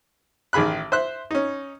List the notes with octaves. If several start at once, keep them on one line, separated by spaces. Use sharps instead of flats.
A1 D#3 G#4 B5 F#6
C5 E5 F#6
C#4 D#4